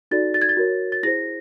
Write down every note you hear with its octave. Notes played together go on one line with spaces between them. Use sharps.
D#4 F#4 A4 D5 A6
A6
G#6
A6
F#4 A#4 C#5
A6
E4 G#4 C5 A#6